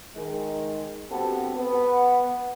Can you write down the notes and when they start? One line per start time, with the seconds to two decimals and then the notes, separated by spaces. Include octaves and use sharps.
0.16 D#3 G#3
1.11 G2 B3 C4 F#4 G4 A4
1.57 B3